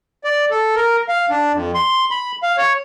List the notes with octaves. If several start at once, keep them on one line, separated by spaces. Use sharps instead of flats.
D5
A4
A#4
F5
D4
F2
C6
B5
F5
C#5